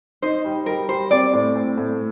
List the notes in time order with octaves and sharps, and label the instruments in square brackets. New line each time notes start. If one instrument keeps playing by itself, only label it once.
[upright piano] D#4 [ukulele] C5
[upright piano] G3
[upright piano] G3 [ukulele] A#4
[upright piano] G3 [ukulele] C5
[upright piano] C4 [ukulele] D5
[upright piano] A2
C4
A2